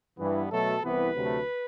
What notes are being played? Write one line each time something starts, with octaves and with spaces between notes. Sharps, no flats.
G2 E3 B3
B2 F#3 A3 A4
C2 C3 E3 B3 B4
D2 C3 F#3 A3